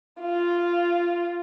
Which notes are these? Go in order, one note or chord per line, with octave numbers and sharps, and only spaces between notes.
F4